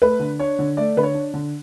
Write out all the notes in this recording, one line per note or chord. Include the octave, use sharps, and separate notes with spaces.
A3 B4
D3
D4 C#5
D3
A3 D5
D3 B4
C#5
D4
D3